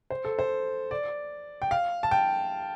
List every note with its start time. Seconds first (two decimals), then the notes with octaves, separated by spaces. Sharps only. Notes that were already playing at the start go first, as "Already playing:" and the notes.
0.10 C5
0.25 A4
0.39 C5
0.91 D5
1.62 G5
1.71 F5
2.03 A5
2.11 G5